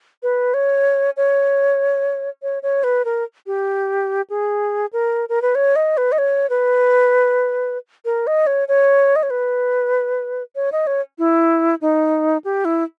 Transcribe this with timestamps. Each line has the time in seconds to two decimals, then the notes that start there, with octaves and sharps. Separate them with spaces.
0.23 B4
0.54 C#5
1.17 C#5
2.43 C#5
2.63 C#5
2.84 B4
3.05 A#4
3.47 G4
4.30 G#4
4.93 A#4
5.29 A#4
5.42 B4
5.55 C#5
5.76 D#5
5.97 B4
6.12 D#5
6.18 C#5
6.50 B4
8.05 A#4
8.27 D#5
8.47 C#5
8.68 C#5
9.16 D#5
9.23 C#5
9.30 B4
10.56 C#5
10.72 D#5
10.87 C#5
11.19 E4
11.81 D#4
12.44 G4
12.65 E4